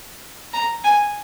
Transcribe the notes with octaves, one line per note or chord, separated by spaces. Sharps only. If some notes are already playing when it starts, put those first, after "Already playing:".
A#5
G#5